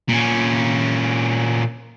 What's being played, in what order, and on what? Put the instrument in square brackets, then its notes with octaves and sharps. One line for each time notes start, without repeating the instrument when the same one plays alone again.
[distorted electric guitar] A#2 C#4